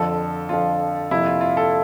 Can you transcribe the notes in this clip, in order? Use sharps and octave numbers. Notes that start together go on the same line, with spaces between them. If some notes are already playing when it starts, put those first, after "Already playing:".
Already playing: F2 D3 F3 A4
F2 D3 F3 F4
F2 C3 F3 A#3 E4
F4
F4
A4